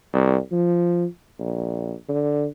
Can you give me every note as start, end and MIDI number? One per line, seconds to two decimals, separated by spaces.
0.14 0.38 36
0.52 1.05 53
1.39 1.93 34
2.09 2.47 50